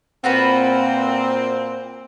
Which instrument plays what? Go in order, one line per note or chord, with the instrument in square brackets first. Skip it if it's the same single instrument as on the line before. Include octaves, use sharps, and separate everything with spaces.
[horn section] A#2 C4 [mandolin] F4 F#4 B4